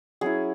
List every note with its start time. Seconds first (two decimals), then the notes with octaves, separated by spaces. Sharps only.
0.21 F#3 C#4 E4 G#4